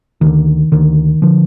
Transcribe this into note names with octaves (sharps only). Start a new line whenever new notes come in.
D2 D3 D#3
D2 D3 D#3
D3 F3